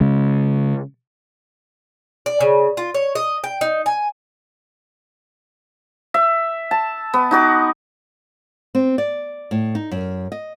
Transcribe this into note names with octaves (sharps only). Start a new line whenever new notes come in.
C#3 G#3
D5
C#3
F4
C#5
D#5
G5
D#4
G#5
E5
A5
B3
D#4 F#4 D6
C4
D5
A2
D#4
F#2
D#5